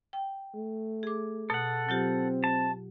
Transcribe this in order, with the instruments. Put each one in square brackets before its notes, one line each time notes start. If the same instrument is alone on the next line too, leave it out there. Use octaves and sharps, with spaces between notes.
[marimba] G5
[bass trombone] A3
[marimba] G#4 D6
[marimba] B2 [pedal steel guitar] A4 F#5
[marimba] F#3 F4 G4 [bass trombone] C4
[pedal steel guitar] A5